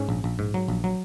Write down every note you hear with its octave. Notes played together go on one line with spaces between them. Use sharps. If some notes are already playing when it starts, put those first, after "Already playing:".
Already playing: G#2 C#4
A#1
A#1
G#2
F#3
A#1
F#3